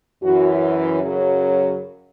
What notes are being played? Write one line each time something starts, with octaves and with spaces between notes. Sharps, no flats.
F#2 E3 F#4
F#2 C#3 F#3